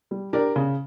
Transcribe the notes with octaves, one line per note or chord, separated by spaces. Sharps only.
G3
D4 G4 A#4 D5
C#3